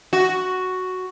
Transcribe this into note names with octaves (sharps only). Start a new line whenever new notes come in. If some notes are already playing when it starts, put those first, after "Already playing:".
F#4